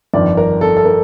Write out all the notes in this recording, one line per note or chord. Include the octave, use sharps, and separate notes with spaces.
G1 F2 D#3 D5
A#4
A4
A4
A#4